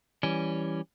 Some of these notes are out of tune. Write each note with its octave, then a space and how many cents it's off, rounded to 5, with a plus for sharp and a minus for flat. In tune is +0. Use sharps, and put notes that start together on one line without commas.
E3 +0 G3 +0 C#4 +0